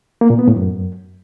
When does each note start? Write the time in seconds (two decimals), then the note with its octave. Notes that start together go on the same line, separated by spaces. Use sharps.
0.21 A#3
0.30 A#2
0.39 B3
0.47 A2
0.56 F#2